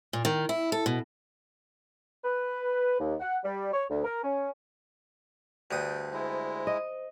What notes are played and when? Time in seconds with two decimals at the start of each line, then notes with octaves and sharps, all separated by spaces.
0.13 A#2
0.25 D#3
0.49 E4
0.72 A4
0.86 B2
2.24 B4
2.99 D#2
3.20 F#5
3.44 G3
3.73 C#5
3.90 D2
4.05 A#4
4.23 C#4
5.71 D2 G2 G5 D#6
6.13 G#3 E4 C5
6.67 D#5